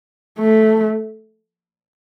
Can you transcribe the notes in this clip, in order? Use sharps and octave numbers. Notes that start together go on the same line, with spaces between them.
A3